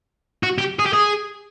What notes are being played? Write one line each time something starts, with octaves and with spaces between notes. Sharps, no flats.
F#4
G4
G#4
G4
G#4